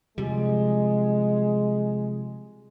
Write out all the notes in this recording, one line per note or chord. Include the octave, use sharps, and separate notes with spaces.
C3 F3 G3 G#3